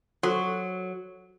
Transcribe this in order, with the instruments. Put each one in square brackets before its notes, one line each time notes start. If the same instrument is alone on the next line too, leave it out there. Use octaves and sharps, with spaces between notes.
[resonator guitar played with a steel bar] F#3 [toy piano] F#4 A4 C5